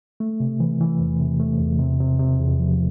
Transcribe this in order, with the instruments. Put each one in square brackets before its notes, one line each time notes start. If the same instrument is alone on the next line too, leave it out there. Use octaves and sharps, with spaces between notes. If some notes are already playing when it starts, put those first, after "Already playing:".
[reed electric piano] A3
C3
E3
E3
E2
C3
A3
E2
C3
C3
C3
E2
F3